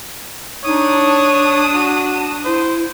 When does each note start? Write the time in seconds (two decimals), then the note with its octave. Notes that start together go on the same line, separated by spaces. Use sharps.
0.64 D4 D#4 C#5 D#6
1.04 A5
1.74 F#4
2.45 E4 C5